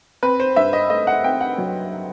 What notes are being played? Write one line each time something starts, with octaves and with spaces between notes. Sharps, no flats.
C4 B4
C5
G2 E5
D#5
A3 D#5
F#5
C4 G5
F#5
F#3